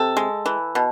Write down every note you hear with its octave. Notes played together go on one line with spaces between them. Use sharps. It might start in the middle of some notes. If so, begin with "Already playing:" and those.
Already playing: C3 A4
G#3
E3
B2